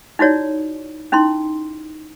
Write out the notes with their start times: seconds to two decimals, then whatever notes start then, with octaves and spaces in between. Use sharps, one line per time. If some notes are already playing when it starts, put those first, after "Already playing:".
0.19 D#4 E4 F#4 C#5 D5
1.12 C#4 D#4 E4 C6